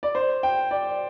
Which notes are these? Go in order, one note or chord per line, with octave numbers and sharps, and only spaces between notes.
D5
C5
G5
D5